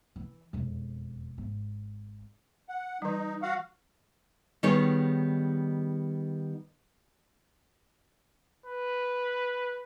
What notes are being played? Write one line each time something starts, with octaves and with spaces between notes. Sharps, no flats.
E3
E1 F2
G#1
F#5
E3 G3 D#4
F#4 F5 F#5
D#3 G3 B3 D#4 G#4 C#5
B4